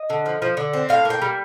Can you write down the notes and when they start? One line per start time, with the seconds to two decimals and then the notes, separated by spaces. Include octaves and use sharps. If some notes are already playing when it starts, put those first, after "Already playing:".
Already playing: D#5
0.10 D3
0.26 F3
0.42 F3
0.57 D3
0.74 C4
0.89 A2 F5
1.05 A#3
1.10 G5
1.22 G3